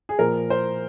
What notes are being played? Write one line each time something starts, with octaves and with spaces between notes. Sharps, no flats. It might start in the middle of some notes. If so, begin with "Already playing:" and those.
G#4
A#2 F3 A#4
C5